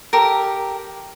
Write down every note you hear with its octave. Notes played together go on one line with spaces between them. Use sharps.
G4 A4 A#4